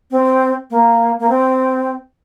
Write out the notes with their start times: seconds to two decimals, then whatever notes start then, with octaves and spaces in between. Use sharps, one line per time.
0.11 C4
0.70 A#3
1.19 A#3
1.29 C4